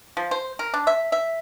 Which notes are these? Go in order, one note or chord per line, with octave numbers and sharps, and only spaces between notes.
F3
C5
A#4
D4
E5
E5